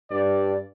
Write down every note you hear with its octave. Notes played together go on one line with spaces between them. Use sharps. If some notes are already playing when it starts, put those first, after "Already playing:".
G2 D5